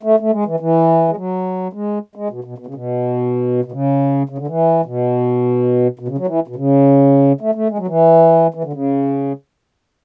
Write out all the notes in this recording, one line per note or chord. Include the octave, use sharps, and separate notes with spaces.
A3
A3
G#3
E3
E3
G#3
F#3
G#3
G#3
B2
B2
B2
C#3
B2
B2
C#3
C#3
D3
E3
B2
B2
C#3
F#3
E3
B2
C#3
A3
A3
G#3
F#3
E3
E3
D3
C#3